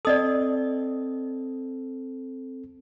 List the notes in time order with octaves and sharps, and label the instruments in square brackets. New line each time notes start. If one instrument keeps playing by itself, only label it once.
[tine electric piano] C4 A4 [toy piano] D5 D#5 D#6